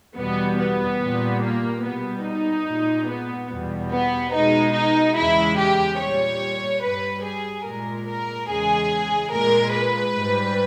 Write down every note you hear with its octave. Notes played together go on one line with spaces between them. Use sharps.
E2 B2 G3 B3
B3
A#2 G3
A#3
B2 G3 B3
D#4
A#2 G#3
B3
E2 B2 G3
B3
B2 G#3 D#4
D#4
E2 C#3 G#3 E4
G4
A#2 G3 C#5
G2 G3 B4
G#4
A#2 G#3 A#4
A#4
E2 C#3 G#3 G#4
A#2 G#3 A#4
B4
G#2 G3